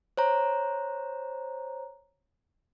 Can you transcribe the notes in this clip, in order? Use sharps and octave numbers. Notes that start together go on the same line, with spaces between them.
C5 C#5 A#5